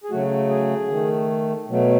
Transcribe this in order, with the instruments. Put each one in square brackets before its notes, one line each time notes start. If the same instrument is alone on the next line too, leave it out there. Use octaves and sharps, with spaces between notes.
[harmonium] G#4
C#3 F#3 A3 F#4
G#4
D#3 A3
B2 F#3 A3